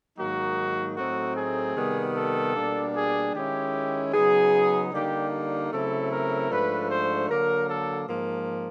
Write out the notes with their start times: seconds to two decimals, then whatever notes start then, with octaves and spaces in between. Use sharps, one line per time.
0.18 G#2 D#3 F#3 A#3 D#4 F#4
0.97 A2 F#3 A3 C4 D#4 F#4
1.37 G#4
1.76 C3 D#3 G3 B3
2.16 A4
2.55 B2 G3 A#3 D4
2.95 G#4
3.34 D#3 G#3 C#4 E4 G4
4.13 C#3 F#3 B3 D#4 G#4
4.93 D3 G3 A#3 D#4 G4
5.72 C#3 F#3 A3 C4 E4 A4
6.11 A#4
6.50 G#2 F3 A3 D4 B4
6.90 C5
7.29 D3 F#3 A#3 A#4
7.69 A4
8.09 G#2 F3 A#3